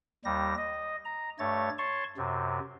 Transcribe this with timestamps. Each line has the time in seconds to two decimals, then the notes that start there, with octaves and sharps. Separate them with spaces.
0.25 D#2 G3 A#6
0.58 D#5
1.05 A#5
1.39 G2 A3 C#5 A6
1.78 C#5 A5 C6 C#6
2.17 F#2 C3